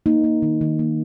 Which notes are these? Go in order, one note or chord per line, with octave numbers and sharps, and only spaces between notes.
A#3 D#4
A#3
D#3
D#3
A#3